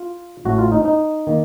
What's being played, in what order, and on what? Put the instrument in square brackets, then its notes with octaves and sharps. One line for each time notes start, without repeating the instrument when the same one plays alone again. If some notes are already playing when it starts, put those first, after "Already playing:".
Already playing: [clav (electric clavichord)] F4
A1 A2 A3 F#4
F4
D#4
D#4
D#3 A#3